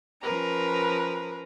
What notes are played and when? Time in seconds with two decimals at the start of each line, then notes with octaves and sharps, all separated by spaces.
0.21 F3 C#4 A#4 B4 A#5